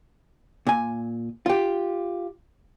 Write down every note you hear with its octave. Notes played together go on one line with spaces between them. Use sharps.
A#2 G#5
F4 G4